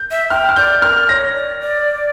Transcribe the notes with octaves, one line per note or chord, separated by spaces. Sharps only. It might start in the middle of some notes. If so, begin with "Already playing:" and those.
Already playing: G6
E5
G5 F6
F6
D5 G6
A#4 F6
C#5 A#6
D5
D5